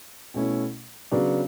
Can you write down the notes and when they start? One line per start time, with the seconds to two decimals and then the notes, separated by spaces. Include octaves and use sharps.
0.34 B2 A3 C#4 E4
1.11 C#3 F#3 B3 D4